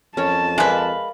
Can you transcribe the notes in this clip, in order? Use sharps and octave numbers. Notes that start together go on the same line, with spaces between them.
F2 C#4 A#4 C#5 A5
G#3 A#4 B4 D5 F5